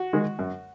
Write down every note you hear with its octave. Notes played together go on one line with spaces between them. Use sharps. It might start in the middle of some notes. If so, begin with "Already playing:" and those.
Already playing: F#4
D#3 G#3
F#2